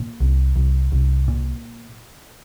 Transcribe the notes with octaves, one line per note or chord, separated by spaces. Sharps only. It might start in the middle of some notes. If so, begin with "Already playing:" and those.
Already playing: A#2
C2
C2
C2
A#2